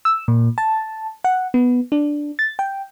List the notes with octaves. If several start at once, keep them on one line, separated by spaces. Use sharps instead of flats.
E6
A#2
A5
F#5
B3
D4
A6
G5